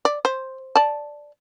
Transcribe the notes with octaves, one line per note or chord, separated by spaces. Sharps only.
D5
C5
D5 A5